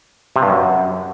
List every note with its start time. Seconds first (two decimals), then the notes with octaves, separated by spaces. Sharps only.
0.36 C3
0.43 G2
0.50 F#2